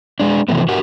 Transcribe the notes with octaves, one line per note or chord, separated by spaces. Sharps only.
G#3 D4
C3 E3 F3 A3 B3
F#4 G4 A#4 F#5